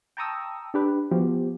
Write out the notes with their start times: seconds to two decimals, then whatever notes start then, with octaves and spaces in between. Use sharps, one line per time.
0.17 G5 A5 A#5 C#6 D#6 E6
0.74 D4 G4 B4
1.11 F3 B3 F#4 G4